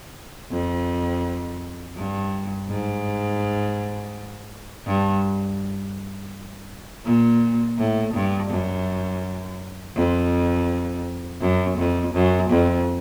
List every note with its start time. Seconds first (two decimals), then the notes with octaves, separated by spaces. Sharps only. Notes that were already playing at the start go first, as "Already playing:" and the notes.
0.51 F2
1.96 G2
2.69 G#2
4.87 G2
7.05 A#2
7.78 A2
8.14 G2
8.50 F#2
9.95 F2
11.41 F#2
11.77 F2
12.14 F#2
12.50 F2